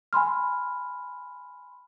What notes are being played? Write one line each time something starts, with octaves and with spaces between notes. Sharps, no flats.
G#5 B5 C6 F6